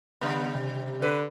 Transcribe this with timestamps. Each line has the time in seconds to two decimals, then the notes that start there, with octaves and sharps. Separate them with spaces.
0.21 C#3 G3 B3
0.55 C3
1.02 D3 B4